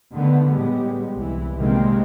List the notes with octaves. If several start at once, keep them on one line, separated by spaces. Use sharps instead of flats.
D3 D#3 A3 B3
A2 G3 G#3 B3
C2 E3
C3 D#3 G3 G#3 A#3 C4